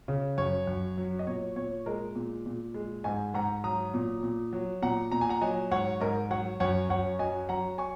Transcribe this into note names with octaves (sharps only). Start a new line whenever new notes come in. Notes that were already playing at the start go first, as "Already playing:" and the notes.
C#3
F#2 C#5
F#2
F#3
D#5
A#2 C#5
A#2 C#5
G#3 A#4 D#5
A#2
A#2
G#3
G#2 D#5 G#5
G#2 F#5 A#5
F#3 A#5 D#6
A#2
A#2
F#3
A#2 F#5 A#5
A#2 A#5
G#5
F#5 A#5
F#3 D#5 G#5
G#2 C#5 F#5
G#2 A#4 D#5
F#3 C#5 F#5
F#2 C#5 F#5
F#2 C#5 F#5
F#3 D#5 G#5
F#3 F#5 A#5
G#5 C#6